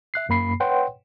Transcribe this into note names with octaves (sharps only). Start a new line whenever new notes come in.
E5 F#6 C7
F#2 A#3 B5 C7
B4 C#5 F#5 G5 C6